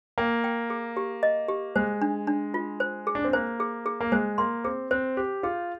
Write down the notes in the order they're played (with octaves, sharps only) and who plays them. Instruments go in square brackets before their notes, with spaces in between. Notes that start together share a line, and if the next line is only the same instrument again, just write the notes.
[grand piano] A#3 [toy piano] G5
[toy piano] G5
G#4
G4
D#5
G4
[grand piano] G#3 [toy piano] C5
[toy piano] D4
D4
F4
C5
G#4
[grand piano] D4
C4
[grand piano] A#3 [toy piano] C5
[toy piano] G#4
G#4
[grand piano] A#3
[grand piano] G#3 [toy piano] C5
[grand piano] A#3 [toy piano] C6
[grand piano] C4 [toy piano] G#4
[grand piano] C4 [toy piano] C5
[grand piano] G4 [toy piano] C5
[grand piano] F4 [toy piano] G#4